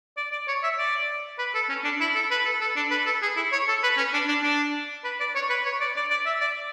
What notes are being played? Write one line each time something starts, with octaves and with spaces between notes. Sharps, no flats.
D5
D5
C#5
E5
D5
B4
A4
C#4
D4
E4
A4
B4
A4
A4
D4
B4
A4
G#4
E4
C#5
A4
B4
C#4
D4
D4
D4
B4
D5
C#5
B4
C#5
D5
D5
D5
E5
D5